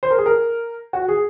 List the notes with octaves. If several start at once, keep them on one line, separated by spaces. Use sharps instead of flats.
C5
A#4
G#4
A#4
F#4
G#4